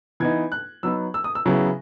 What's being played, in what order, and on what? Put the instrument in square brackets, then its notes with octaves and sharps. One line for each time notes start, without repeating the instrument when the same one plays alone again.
[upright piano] E3 B3 D#4 G#6
F#6
F#3 B3 D#4 E6
E6
D#6
E6
C#3 F#3 B3 E4